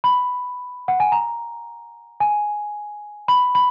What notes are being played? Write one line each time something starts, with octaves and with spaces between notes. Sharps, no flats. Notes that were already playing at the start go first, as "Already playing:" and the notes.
B5
F#5
G#5
A#5
G#5
B5
B5